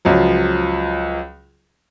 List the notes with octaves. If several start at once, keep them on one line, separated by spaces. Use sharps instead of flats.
C#2 F3 F#3